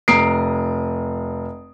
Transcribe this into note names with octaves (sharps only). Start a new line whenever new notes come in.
F1 A#5 D#6 C7 D7